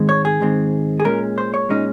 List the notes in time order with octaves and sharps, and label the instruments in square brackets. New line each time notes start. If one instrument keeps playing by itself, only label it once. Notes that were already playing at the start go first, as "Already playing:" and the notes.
Already playing: [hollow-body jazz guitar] G#2 D#3 G#3 C4
C#5
G#4
G#2 D#3 G#3 C4
G#4
A#2 G#3 C#4 A#4
C5
C#5
A#2 G#3 C#4 D#4